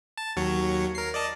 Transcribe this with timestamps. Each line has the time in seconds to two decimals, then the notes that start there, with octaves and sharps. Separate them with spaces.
0.17 A5
0.36 D#2 F#3 C#5
0.95 A#4 C7
1.14 D5 D#5 A5